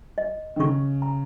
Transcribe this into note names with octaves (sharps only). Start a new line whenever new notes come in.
D#5
D#3
C#3 C#6
A#5